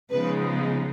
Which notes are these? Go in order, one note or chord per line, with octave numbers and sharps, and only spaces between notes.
C#3 F3 G#3 B3 D#4 B4